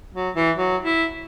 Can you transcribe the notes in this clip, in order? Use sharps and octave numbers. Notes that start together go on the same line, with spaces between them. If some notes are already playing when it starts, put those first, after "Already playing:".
F#3
E3
F#3
E4